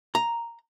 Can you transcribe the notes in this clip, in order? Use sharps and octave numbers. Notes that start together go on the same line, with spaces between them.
A#5